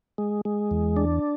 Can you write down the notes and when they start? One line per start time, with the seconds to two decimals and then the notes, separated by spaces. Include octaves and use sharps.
0.18 G#3
0.45 G#3
0.71 E2
0.97 D4